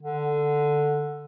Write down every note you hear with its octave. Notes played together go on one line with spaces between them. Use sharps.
D3